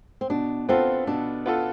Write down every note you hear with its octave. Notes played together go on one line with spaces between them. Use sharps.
C4
B2 D4
B3 C4 F4 A4
B2 D4
B3 F4 A4